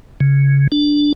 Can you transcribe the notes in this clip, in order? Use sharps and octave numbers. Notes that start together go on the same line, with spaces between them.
C#3
D4